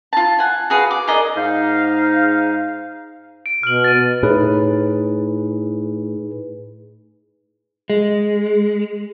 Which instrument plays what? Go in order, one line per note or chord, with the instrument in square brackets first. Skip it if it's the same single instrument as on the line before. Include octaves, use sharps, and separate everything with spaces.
[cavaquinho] F4 A5
F#5 G#5
F#4 G#4 B4 F5
D6
G#4 A#4 D5 D#5
[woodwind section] G#2 D#4 F5
[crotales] D7
[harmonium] B2 [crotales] F6 F#7
[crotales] A6 D#7
[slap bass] A2 [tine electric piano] D#4 G#4 B4
[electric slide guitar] G#3